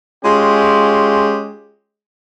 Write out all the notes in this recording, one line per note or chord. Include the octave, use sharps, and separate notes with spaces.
G#3 C#4 F4 G4